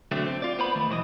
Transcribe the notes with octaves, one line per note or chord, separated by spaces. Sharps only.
D3 F#3 A3 C4
C4
F4 D5
B3 C5 B5
D#3 A3
B1 E3 C5 D#5